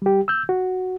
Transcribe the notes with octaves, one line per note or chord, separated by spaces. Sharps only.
G3 G4
E6 G6
F#4